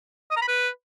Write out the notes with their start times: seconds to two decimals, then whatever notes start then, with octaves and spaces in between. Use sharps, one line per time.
0.31 D#5
0.36 A#5
0.42 B5
0.48 B4